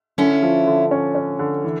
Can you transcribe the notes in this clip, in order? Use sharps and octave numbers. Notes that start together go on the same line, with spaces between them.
D3 C#4 E4
F3
D3
C#4
C#4
D3
E3